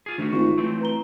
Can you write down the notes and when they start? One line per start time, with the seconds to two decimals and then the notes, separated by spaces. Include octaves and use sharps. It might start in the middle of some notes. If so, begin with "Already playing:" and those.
0.06 F4 G#4
0.18 D2 D#3 A3 F#4
0.33 G#1 F4 C#6
0.57 E3 F#3 A3 C4
0.81 B4 A#5 G7